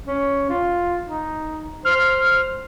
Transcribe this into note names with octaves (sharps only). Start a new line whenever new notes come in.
C#4
F4
D#4
C5 F6